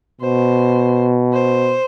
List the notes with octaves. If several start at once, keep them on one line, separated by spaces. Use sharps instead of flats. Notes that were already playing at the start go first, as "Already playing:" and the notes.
B2 C5
C5